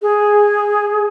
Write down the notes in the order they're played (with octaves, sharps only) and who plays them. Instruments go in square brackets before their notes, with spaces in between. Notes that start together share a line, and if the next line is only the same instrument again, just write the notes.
[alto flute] G#4